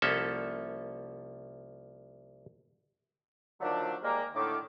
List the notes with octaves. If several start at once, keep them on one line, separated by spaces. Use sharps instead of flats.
C2 F3 A#3 C#4 A4 E5
D3 D#3 F3 F#3 A3 D4
D#2 D#3 G3 G#3 A#3
A2 D3 D#3 D6